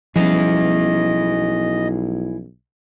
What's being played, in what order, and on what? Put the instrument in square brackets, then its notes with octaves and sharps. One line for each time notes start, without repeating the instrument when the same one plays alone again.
[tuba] B1 [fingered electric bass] F3 G3 C#4 [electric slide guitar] E4 G#4 [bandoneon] D#5